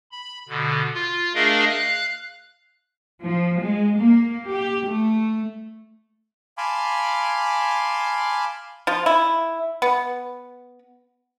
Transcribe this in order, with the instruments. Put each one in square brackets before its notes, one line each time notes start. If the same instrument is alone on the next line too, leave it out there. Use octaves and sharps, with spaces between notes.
[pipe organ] B5
B2 D3
F4
A3 D4 G#4 A#4 D#5 F5
F5 F#6
[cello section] F3
G#3
A#3
G4
A3
[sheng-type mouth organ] F5 G#5 A5 B5 C6 D6
[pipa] F3 F4
E4
B3